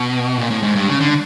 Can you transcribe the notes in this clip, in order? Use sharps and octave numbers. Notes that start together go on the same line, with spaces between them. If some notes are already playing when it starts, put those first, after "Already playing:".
Already playing: B2
A#2
A2
G#2
G2
C#3
D3